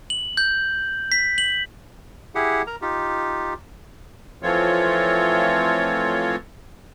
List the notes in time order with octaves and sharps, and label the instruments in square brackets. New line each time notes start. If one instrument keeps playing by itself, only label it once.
[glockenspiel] F#7
G6
B6
F#7
[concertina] E4 G4 G#4 F#5
A#4 A#5
D#4 F4 G4
[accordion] E3 F3 A3 C4 F4 C#5